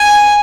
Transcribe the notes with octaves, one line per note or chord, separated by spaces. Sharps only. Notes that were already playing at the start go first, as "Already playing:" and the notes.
Already playing: G#5